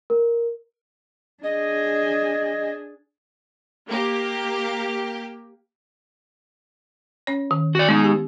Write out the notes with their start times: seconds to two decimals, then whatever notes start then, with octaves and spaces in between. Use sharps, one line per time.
0.10 A#4
1.43 D4 G#4 D#5
3.88 A#3 G4
7.27 C#4 C#5
7.51 D#3
7.75 F#4 D5
7.89 G#3 B3 D#4
8.04 G4